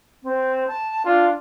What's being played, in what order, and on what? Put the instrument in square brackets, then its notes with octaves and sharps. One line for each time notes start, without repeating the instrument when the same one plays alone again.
[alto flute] C4
A5
[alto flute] D4 [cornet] F4